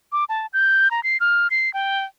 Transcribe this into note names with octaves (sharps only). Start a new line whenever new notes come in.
D6
A5
G6
A#5
C7
F6
C7
G5